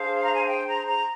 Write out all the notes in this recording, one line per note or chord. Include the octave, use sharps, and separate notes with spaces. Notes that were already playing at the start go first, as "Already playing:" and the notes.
Already playing: D4 G#4 C5 F5
A#5
G#5
G5
A#5
A#5